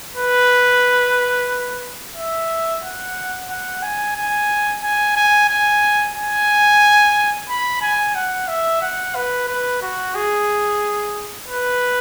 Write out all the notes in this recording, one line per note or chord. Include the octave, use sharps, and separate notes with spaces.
B4
E5
F#5
F#5
G#5
G#5
G#5
G#5
G#5
G#5
B5
G#5
F#5
E5
F#5
B4
B4
F#4
G#4
B4